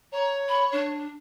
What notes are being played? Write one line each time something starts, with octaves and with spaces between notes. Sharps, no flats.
C#5 A#5
B5
D4